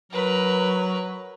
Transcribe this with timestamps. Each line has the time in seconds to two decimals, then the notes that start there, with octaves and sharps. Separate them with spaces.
0.12 F#3 A#4 B4